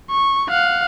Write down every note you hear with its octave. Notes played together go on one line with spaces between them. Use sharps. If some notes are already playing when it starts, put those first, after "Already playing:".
C#6
F5 F#5